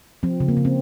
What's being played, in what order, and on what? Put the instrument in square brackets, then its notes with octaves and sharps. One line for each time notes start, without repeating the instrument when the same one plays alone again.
[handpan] F3 C4
C#3
A#3
C#3
C4